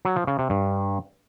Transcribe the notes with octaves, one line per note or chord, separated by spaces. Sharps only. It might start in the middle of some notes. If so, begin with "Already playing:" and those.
F#3
F3
C#3
C3
G2